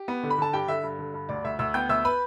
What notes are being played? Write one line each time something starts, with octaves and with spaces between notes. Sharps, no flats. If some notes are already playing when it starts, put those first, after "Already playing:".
Already playing: G4
B3
D3
B5
D3 A5
G2 G4 G5
D3 E5
G2
D3
G2
D2 D5
D2 E5
D2 E5 E6
B3 G5 G6
D2 E5 E6
B4 B5